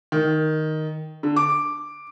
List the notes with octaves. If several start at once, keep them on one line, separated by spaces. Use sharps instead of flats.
D#3
D3
D6